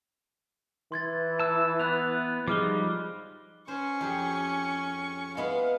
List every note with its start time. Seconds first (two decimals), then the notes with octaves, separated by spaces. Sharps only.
0.92 E3 C6 G#6 A6
1.40 A5 E6
1.79 B3 B5 F#6 F7
2.47 F3 G3 G#3 D#4 D6 F6 G7
3.68 C#4 C5 C#6
4.01 F2 G4 G#4
5.37 G#3 B3 E4 F5